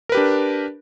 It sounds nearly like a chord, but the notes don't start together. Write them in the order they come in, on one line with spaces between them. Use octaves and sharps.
A#4 B4 G4 D4